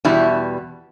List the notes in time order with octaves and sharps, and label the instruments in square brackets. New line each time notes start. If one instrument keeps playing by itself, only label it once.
[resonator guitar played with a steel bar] E2 B2 G3 E4